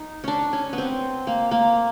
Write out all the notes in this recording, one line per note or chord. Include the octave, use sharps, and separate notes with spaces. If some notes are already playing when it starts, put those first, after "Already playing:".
Already playing: D#4
C#4 D4
C#4
B3
C4
A#3
A#3